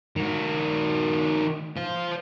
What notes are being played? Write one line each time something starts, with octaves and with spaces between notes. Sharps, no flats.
D#3 F#4
C5 F5